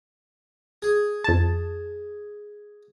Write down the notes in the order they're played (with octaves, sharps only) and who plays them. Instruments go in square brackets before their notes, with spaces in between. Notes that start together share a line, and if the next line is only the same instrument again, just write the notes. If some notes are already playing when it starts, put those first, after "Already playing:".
[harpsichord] G#4
[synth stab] F2 A5